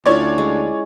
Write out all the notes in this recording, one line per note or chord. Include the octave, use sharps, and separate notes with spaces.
D2 C#4 E4 F4 C#5 D5
G#3